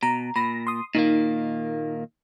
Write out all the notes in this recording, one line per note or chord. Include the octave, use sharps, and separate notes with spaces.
B2 A#5
A#2 B5 A#6
C6 D#6
A#2 D#3 A#3 D#4